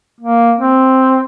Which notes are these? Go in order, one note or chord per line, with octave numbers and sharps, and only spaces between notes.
A#3
C4